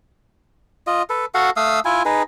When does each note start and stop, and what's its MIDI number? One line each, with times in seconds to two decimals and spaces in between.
0.87 1.02 65
0.87 1.02 75
1.10 1.25 69
1.10 1.25 71
1.34 1.50 66
1.34 1.50 69
1.34 1.50 77
1.34 1.50 78
1.57 1.80 57
1.57 1.80 77
1.57 1.80 87
1.57 1.80 88
1.85 2.03 64
1.85 2.03 65
1.85 2.03 80
2.05 2.23 63
2.05 2.23 68
2.05 2.23 71